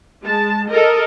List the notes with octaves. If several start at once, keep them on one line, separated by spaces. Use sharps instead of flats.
G#3 A5
A4 A#4 D#5